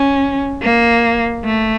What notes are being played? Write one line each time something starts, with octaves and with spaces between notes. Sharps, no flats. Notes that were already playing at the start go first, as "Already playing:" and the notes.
Already playing: C#4
A#3
A3